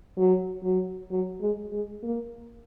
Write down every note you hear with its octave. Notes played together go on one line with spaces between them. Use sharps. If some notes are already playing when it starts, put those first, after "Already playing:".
F#3
F#3
F#3
G#3
G#3
A#3